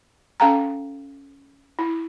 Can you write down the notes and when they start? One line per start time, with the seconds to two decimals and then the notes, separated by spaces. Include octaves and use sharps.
0.40 C#4 A4 F5 G5 A5 A#5
1.79 E4